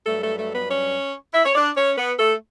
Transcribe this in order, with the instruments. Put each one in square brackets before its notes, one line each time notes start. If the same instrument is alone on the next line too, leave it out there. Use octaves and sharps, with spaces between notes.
[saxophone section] G2 F#3 A3 A4
A3 A4
A3 A4
B3 B4
C#4 C#5
E4 E5
C#5
D4 D5
C#4 C#5
B3 B4
A3 A4